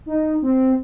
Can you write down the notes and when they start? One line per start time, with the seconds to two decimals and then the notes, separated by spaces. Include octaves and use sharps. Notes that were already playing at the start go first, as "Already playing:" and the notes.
0.06 D#4
0.42 C4